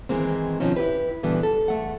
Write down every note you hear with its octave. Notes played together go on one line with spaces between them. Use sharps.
D#3 E3 G#3 A#3 C4
D#2 B2 D#3 F3 C4 C#4
E4 G4 B4
A#2 D3 E3 G3 B3
A4
E2 A3 F#5